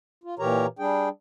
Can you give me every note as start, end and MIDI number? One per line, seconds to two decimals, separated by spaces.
0.24 0.35 65
0.39 0.66 46
0.39 0.66 52
0.39 0.66 67
0.39 0.66 70
0.39 0.66 73
0.39 0.66 82
0.79 1.09 55
0.79 1.09 62
0.79 1.09 68
0.79 1.09 79